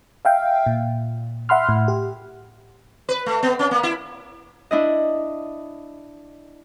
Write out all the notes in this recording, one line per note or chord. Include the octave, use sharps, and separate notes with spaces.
E5 F5 G5
A#2
E5 F#5 B5 C6 F6
A2
G4
B4
A3
B3
C#4
A#3
E4
D4 E4 D#5